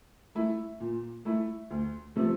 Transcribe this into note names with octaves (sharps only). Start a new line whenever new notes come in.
A3 E4
A#2
A3 E4
D2
C3 F3 A3